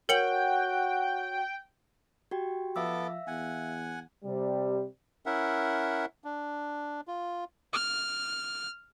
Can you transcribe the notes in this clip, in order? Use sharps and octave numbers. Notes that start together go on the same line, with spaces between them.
F#4 A#4 C#5 F#5 G5 C#7 F#7
F#4 G4 G5
F3 B3 A4 E5 F5 D6 E6
E2 F#5 G#5
C3 G3
C#4 E4 A#4 E5 F#5
D4
F4
F6